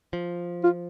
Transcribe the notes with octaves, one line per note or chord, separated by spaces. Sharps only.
F3
F4